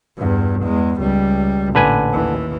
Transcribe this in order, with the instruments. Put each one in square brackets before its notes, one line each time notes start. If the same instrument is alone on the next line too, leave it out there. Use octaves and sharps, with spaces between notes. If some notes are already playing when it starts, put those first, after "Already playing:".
[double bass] E2 G2
E2 G#3
C#2 G3
[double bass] A1 A#2 [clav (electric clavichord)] D3 B4 G#5
[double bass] D#2 E3